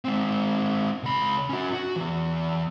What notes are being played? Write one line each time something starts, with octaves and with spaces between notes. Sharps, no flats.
G#3 C4
C#2 B5
C#4 F#4
F#4
E3 B3